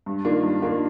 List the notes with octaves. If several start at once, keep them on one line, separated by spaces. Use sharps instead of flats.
G2
D#3 A#3 D4 F4
G2
D#3 A#3 D4 F4